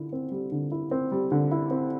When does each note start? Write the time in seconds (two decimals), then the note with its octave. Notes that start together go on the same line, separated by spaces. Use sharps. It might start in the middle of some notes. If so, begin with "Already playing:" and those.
Already playing: D3 E4
0.13 C4
0.32 G3
0.52 D3
0.72 E4
0.91 C4
1.12 G3
1.32 D3
1.51 E4
1.71 C4